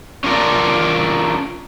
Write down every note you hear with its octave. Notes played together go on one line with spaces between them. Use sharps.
C#4 D4 F4 A#4 D5